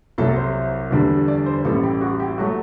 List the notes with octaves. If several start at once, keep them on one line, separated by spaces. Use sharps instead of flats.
C2 C3 F#3 A4
C5
E2 D3 G3
D5
C5
A1 A2 G3 A4
G4
F#4
G4
F#3 A3 F#4